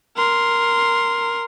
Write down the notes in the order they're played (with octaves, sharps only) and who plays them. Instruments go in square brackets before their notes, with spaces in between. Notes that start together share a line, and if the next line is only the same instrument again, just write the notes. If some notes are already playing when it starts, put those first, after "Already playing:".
[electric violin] A#4 C6